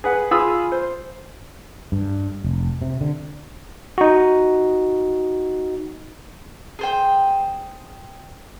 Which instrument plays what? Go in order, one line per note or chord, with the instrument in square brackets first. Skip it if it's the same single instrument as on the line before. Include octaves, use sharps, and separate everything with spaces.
[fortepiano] G#4 B4 F#5
F4 G#4 B5 D#6 E6
C5
[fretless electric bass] G2
F1
C3
D3
[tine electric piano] D#4 F#4
[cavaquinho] G#4 C5 G5